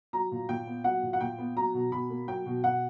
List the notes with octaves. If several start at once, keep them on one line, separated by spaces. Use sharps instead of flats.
F#3 A#5
A#2
A#2 G5
B3
F#3 F#5
A#2
F#5
A#2 G5
B3
F#3 A#5
B2
B2 B5
A#3
F#3 G5
B2
B2 F#5